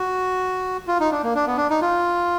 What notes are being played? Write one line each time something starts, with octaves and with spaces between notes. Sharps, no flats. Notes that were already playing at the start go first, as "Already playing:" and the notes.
Already playing: F#4
F4
D#4
D4
A#3
D4
B3
D4
D#4
F4